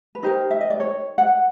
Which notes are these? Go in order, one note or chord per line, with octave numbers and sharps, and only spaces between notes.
B4
D#4 G4 A#4 C5
E5
D#5
D5
C#5
F#5